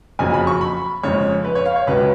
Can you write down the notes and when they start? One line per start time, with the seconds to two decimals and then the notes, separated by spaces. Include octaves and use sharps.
0.19 F#1 F2 C#3 F#3 G#5
0.34 B5
0.47 C#6
0.61 B5
1.03 F2 C#3 G#3 C#4 C#5
1.44 B4
1.55 C#5
1.66 F5
1.76 C#5
1.87 C#2 C#3 F#3 B4